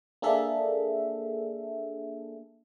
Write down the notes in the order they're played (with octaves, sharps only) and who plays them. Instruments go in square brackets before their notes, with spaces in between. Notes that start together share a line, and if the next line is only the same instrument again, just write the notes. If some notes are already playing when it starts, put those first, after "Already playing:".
[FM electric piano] A#3 D4 G#4 A4 E5